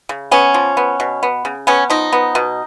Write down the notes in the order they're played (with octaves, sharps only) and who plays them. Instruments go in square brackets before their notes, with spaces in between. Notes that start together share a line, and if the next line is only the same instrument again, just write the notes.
[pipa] C#3
B3 C#4
F3
B3
B2
B3
C#3
B3 C#4
F3 D#4
B3
B2